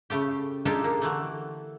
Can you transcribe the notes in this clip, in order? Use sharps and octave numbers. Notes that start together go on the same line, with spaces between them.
C#3 A3 G4
G#3 D4 D#4 F4 G4 A4
A#3
D3 E3 A3